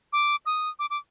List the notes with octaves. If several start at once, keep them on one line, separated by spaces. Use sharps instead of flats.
D6
D#6
D6
D6